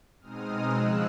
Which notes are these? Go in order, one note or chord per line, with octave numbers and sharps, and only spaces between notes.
B2 G#3 C4 D#4 D#6 F6
C#3 F3 G#3 E6 F#6